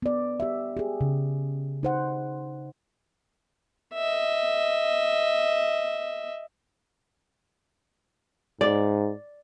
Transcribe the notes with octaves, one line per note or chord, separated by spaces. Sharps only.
B3 D5
G4 E5
G4 G#4
C#3
D#4 C5 F#5
D#5 E5
G#2 D5